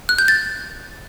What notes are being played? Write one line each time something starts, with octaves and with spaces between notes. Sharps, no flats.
F#6
G6
A6